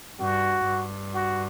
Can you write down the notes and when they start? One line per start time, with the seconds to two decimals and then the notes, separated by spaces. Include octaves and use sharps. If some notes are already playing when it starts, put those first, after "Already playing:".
0.19 G2 F#4
0.66 G2
1.14 F#4